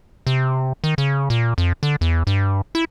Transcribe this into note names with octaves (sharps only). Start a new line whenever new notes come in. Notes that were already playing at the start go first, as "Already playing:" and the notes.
C3
D#3
C#3
A#2
F2
D3
E2
G2
E4